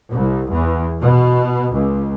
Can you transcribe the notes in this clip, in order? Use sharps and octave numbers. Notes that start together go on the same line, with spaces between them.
C2
E2
B2
C#2